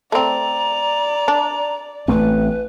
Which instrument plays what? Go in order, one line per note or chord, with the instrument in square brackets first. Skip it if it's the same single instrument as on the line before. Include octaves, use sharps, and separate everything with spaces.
[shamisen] A3 C4 [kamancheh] D5 [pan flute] A#5
[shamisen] D4
[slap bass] A1 A3 C4 [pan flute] B4